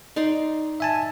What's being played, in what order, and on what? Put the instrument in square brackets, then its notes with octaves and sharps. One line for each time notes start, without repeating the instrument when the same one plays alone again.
[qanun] D#4 D5 C6
[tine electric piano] E5 G#5 A5